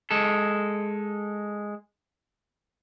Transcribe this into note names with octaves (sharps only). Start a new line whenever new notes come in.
G#3 A4